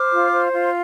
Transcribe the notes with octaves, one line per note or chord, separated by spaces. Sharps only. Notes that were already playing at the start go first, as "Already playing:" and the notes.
Already playing: C5 D6 F6
F4
C5
F4